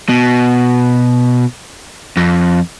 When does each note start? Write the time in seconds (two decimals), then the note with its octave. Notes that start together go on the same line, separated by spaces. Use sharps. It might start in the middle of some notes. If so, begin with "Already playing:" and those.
0.09 B2
2.17 F2